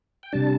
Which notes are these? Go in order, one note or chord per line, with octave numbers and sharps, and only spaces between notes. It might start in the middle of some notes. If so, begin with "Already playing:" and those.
G5
C3 G3 D4 A5